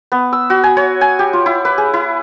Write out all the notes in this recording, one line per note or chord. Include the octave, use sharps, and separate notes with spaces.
B3
E6
F#4
G#5
C#5
G#5
G4
F4
E4
B4
G#4
E4